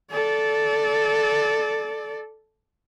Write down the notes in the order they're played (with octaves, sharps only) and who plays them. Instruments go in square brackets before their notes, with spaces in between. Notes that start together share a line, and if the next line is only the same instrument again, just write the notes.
[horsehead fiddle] A4 D5